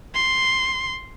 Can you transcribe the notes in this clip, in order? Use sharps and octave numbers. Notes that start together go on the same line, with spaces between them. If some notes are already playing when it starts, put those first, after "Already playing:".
C6